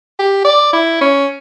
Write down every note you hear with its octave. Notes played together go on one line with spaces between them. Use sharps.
G4
D5
E4
C#4